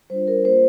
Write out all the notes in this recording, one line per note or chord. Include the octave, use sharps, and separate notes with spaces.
G3 D4 F4 C5
A#4
A#3 F4 C5